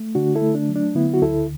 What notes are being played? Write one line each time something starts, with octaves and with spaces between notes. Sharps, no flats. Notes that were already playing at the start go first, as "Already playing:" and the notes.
Already playing: A3
D3 D4 F#4
E4 A4
A3
D4
F#3
D4
D3 B3 E4
F#4
D2 E4 A4